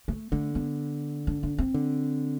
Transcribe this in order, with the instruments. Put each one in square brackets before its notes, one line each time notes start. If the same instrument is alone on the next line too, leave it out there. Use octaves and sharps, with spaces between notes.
[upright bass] A3
[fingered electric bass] D3 [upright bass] A3
[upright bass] B3
D4
D4
C4
[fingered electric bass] D3